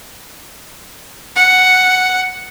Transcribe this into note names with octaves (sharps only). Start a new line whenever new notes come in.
F#5